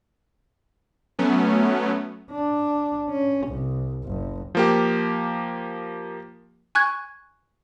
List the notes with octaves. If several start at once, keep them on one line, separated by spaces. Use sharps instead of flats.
F#3 A3 B3 C#4
D4
C#4
C2
F#1
F3 A#3 G4
G#5 C#6 F#6 G#6